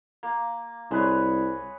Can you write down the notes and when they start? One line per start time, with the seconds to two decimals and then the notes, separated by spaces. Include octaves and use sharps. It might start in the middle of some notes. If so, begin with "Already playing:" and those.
0.23 A#3
0.91 C2 G#3 B4 C#5